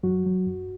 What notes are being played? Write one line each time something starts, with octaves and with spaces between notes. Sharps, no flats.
F#2 F#3 F#4
F#3
F#2